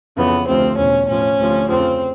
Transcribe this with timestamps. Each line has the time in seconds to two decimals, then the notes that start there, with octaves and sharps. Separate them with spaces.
0.18 F2 C#3 E3 B3
0.47 D2 C3 F3 C4
0.77 E2 B2 C#4
1.08 A2 F3 C#4
1.39 D2 C3 F3
1.69 F2 C#3 F3 C4